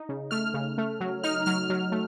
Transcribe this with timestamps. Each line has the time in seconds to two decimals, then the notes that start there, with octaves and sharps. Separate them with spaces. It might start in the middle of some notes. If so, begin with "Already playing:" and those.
Already playing: D#4
0.09 C#3
0.31 A3 F6
0.54 C#3
0.78 A3
1.00 F#3
1.23 D#4 F6
1.46 F#3 F6
1.70 F#3
1.92 A3